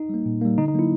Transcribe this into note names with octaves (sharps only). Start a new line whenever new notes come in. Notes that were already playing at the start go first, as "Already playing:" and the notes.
Already playing: D#4
G3 A#3
A#2
G3 A#3
D3 D#4
D#4
F#3 A#3 E4